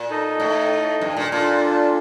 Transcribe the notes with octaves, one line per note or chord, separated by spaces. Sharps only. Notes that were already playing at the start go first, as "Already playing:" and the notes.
Already playing: A#2
D#4 A4 D#5
A2
G2
A#2
A#2 D4 F4 A4